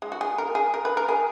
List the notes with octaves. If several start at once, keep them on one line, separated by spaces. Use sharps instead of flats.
G#3
F#4
G#4
A#4
G#4
A#4
B4
A#4
G#4